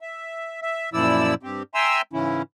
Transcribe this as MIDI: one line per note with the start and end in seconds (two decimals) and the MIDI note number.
0.01 0.61 76
0.62 0.90 76
0.93 1.34 42
0.93 1.34 46
0.93 1.34 53
0.93 1.34 64
0.93 1.34 74
0.93 1.34 88
1.43 1.63 43
1.43 1.63 60
1.43 1.63 67
1.74 2.02 76
1.74 2.02 79
1.74 2.02 80
1.74 2.02 82
1.74 2.02 84
1.74 2.02 88
2.13 2.42 44
2.13 2.42 49
2.13 2.42 52
2.13 2.42 61
2.13 2.42 64